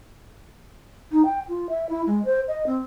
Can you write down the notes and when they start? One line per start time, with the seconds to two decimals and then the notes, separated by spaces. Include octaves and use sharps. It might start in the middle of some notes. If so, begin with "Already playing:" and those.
1.11 D#4
1.25 G5
1.48 F4
1.69 E5
1.89 E4
2.06 G#3
2.25 C5
2.47 D#5
2.66 C4